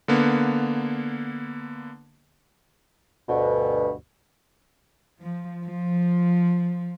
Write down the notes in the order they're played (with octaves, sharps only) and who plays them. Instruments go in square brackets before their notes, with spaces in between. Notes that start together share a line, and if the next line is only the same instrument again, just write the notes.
[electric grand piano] D3 A#3 B3
[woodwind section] D2 G2 B2
[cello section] F3
F3